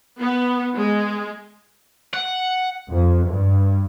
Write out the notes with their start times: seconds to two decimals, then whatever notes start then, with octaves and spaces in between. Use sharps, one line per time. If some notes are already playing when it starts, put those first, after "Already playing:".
0.20 B3
0.76 G#3
2.14 F#5
2.92 F2
3.29 G2